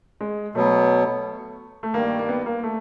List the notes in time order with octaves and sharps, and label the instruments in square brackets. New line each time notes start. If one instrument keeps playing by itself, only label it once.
[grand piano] G#3
[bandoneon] B2 F#3 B3 [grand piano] A3
[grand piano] A3
[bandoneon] G2 D#3 G3 [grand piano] A#3
[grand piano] A#3
B3
A#3
A3